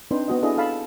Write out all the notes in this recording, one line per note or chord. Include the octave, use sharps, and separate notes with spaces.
C4 D4 D#4 B4 C5
B3 F#4 D#5
D4 E4 G#4 A4 D#5
A4 F5 A5 B5